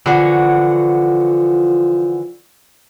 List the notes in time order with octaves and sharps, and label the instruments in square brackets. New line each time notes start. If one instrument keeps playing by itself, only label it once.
[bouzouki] D3 E3 F#4 [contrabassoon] F3